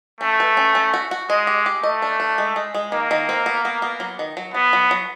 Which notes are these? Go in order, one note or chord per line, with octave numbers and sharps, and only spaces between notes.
A3 C#4
B4
C#4
C#4
F#4
F#4
G#3 D#5
G4
G4
A3 D#5
D4
D4
G#3
G#3
G#3
D#3 A#3
D#3
C4
B3
B3
B3
F#3
D#3
F#3
F#3 B3
F#3
F#3